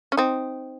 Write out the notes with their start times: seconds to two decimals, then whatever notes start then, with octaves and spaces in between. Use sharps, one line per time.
0.12 C#4
0.17 C4 D#4